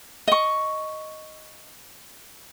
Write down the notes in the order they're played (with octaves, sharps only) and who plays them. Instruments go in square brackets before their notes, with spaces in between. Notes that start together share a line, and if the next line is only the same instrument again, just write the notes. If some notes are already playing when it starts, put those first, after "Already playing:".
[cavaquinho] D#5 C#6